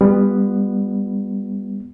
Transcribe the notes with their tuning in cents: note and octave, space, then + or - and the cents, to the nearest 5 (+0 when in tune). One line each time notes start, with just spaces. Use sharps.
G3 +25 B3 +0 F4 +25